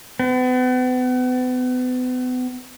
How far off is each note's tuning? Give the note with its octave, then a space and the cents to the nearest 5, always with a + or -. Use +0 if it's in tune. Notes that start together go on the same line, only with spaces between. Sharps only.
B3 +35